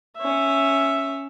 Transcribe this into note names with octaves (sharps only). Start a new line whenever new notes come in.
C#4 E5